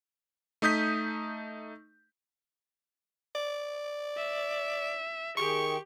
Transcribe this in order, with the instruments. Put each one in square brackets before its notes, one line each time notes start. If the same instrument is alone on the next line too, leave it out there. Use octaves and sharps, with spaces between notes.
[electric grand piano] A3 D#4 D#6 G6 B6
[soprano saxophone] D5
[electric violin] E5
[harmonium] D#3 G#4 G5 [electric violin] G4 [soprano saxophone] C#6